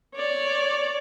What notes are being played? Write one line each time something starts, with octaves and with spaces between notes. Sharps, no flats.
C#5 D5